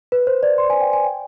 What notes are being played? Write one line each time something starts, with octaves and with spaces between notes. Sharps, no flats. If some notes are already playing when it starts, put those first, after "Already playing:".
B4
C5
D5
C6
G#5
G5
G#5
G5